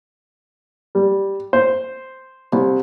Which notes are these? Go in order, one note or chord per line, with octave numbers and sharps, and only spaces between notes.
G3
C5
C2